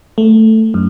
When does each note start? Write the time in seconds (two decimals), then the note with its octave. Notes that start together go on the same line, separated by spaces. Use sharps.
0.18 A3
0.74 F#2